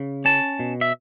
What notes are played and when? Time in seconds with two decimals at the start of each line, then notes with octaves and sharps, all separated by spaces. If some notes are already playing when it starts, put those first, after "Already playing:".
Already playing: C#3
0.25 C#4 A5
0.59 B2
0.81 E5